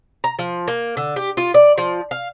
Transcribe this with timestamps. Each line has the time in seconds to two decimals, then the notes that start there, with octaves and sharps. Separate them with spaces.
0.24 A#5
0.39 F3
0.68 A#3
0.97 D3
1.16 G4
1.37 F4
1.54 D5
1.78 F3
2.11 F5